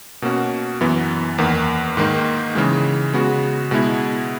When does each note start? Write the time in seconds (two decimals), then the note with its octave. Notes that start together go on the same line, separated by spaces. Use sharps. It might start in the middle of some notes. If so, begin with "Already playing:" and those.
0.22 B2 A#3 C#4 F#4
0.81 F#2 E3 B3
1.38 E2 D#3 A#3
1.97 G#2 D#3 A#3 D#4
2.55 C#3 E3 G#3
3.13 C#3 G#3 B3 F#4
3.71 B2 G#3 B3 E4